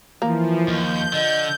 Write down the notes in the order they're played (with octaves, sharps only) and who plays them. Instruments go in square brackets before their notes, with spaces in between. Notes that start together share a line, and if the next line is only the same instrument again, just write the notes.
[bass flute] E3 [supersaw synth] F3 [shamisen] A#3
[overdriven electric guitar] D#2 [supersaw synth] G6
[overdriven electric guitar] D3 [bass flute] D#5